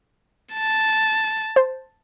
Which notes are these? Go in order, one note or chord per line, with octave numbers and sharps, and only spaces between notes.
A5
C5